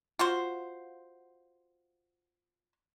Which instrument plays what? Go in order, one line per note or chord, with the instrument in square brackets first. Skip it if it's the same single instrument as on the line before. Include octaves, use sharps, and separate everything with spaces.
[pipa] F4 F#4 C5